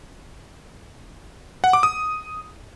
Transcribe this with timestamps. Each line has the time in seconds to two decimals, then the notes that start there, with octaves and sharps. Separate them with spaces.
1.64 F#5
1.73 D6
1.83 D#6